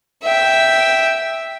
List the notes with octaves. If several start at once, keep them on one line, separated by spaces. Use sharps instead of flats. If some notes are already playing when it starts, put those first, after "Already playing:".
E5 G5